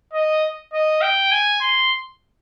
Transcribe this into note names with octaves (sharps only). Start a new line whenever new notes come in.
D#5
D#5
G5
G#5
C6